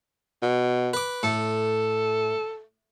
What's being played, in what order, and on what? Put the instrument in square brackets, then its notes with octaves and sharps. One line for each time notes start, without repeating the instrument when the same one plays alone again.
[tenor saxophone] B2
[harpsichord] B4 D6
[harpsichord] A2 [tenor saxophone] A4